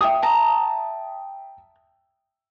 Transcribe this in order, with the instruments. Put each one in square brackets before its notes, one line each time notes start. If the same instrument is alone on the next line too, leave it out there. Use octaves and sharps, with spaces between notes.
[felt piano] E5 G5 D#6
[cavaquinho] A5 A#5